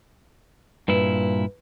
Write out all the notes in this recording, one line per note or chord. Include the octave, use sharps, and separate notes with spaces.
G2 A#2 E4 B4